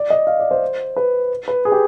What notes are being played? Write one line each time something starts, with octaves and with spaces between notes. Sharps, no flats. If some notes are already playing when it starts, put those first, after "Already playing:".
Already playing: D5
D#5
F5
D5
C5
B4
B4
G#4
G4